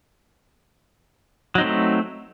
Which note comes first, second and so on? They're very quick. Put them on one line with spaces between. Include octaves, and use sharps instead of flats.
F#3 D#4 C4 A3